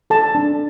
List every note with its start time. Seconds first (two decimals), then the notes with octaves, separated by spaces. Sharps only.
0.10 A4 A5
0.35 D4